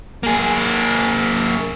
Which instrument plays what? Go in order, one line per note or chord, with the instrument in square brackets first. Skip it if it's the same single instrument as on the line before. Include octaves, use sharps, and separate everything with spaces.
[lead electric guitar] A#3 G#4